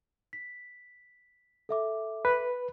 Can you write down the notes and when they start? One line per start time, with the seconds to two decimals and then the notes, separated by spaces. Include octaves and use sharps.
0.33 B6
1.69 A4 E5 D6
2.25 B4